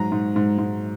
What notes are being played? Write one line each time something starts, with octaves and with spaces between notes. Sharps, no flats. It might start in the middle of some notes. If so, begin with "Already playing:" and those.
Already playing: G#2 F#3 A#5
G#2
G#2
G#2